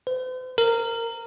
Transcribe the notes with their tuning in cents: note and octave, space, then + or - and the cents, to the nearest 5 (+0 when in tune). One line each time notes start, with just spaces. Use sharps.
C5 -45
A#4 -15